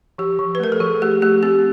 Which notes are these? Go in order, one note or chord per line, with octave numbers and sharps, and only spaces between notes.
F3 G4
F3
B4
A3 A#4
A4
F3 G#4
A3 G4
A3 G4
C4 G4